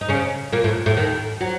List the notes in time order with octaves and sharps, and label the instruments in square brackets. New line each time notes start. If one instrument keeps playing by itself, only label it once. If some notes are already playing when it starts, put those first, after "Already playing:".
[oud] D#4
C#3 C#4
A#2 A#3
A2 A3
A2 A3
D#2 D#3
F#3